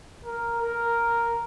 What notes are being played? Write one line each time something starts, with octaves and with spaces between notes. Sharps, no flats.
A#4
A#4